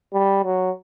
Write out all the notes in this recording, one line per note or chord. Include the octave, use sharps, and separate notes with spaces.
G3
F#3